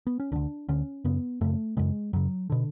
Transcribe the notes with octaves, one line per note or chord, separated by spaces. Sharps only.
B3
C#4
D2 D3 D4
D2 D3 C#4
F#2 C#3 B3
F#2 C#3 A3
F#2 C#3 G#3
F#2 C#3 F#3
B2 D3